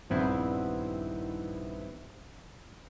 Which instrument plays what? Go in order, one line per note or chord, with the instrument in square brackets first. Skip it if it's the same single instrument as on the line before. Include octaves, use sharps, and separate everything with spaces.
[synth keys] A#1 G2 D#3 B3 C4 E4